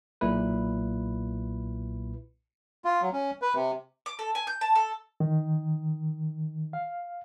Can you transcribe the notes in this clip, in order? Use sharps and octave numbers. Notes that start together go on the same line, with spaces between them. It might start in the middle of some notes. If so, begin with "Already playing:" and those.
B1 A#2 E4 B4
F4
F#3
C#4
B4
C3
D6
A4
G#5
G6
A5
A4
D#3
F5